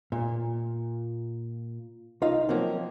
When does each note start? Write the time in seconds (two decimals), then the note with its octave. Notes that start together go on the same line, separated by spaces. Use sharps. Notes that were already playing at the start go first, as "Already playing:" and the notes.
0.12 A#2
2.22 C2 D#4 F4 F5
2.49 F3 F#3 A#3 C4